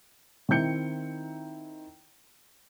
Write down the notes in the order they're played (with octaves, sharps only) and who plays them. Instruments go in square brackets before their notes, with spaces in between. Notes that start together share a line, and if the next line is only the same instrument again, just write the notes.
[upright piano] D#3 C4 E4 G6 C#7